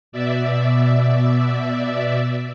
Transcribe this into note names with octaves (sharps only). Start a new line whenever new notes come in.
B2 D5 E5